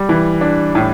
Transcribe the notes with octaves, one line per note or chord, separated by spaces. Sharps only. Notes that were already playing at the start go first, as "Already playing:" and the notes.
Already playing: G3
E3
D4
A2